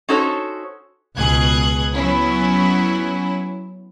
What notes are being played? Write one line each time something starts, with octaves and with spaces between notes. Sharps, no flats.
C#4 D#4 F#4 A4 C5 C#5
C#2 B2 G#4 F#6 G#6
F#3 B3 C#4 E4